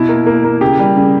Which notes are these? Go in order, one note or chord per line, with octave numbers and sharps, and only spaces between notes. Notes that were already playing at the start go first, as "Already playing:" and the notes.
Already playing: B2 E4
A#3
A#3
A#3
C#3 G4
G3
C#3